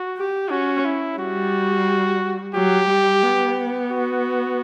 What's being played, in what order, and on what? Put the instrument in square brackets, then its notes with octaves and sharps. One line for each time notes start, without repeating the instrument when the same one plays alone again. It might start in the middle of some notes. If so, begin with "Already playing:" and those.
Already playing: [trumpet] F#4
[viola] G4
[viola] C#4 [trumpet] F#4
[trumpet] E4
[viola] G3 [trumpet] F#4
[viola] F#3 [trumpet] G4
[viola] G3
B3
[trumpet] F#4